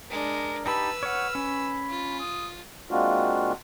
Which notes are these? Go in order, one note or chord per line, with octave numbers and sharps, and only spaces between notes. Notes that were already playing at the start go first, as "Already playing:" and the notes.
G#3 D4 A#4
D#4 G4 B4 A5 B5 E6
C#5 F#5 F6
C#4 B5
F4
D#6
G#3 A#3 C4 D4 F4 F#4